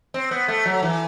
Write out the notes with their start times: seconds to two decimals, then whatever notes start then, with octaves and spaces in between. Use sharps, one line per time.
0.14 C4
0.31 B3
0.48 A3
0.65 F#3
0.83 E3